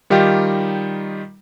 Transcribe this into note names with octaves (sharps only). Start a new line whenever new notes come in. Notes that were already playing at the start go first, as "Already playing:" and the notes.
D#3 G3 D#4 F4 G4